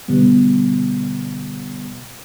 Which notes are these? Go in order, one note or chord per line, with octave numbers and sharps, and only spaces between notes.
B2 D3 G3 B3